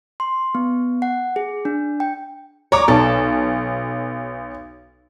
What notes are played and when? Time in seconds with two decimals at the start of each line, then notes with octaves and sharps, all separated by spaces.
0.20 C6
0.55 B3
1.02 F#5
1.36 G#4
1.65 D4
2.00 G5
2.72 C#5 A#5 D6
2.88 B1 A4